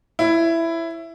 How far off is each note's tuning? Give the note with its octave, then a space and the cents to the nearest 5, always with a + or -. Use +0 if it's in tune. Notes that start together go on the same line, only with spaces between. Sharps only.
E4 +10 C#5 -30